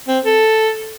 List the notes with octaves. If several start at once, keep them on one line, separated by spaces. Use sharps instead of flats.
C4
A4